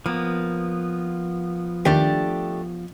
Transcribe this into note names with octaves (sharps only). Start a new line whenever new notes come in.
F3 A#3 B3
D#2 A3 D4 G4